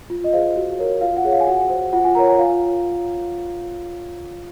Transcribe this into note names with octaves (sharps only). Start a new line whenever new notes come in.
F4
D#5
G#4 C5 F5
F#4
A#4 C#5
F4 F5
F#5
G#4 C#5
F5
G#5
F#4 F#5
C5
F4 F#5
G#5
A#4 C#5 A#5
G#5
F4 F5